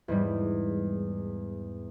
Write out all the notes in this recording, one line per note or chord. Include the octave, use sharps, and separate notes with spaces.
E2 G#2 G3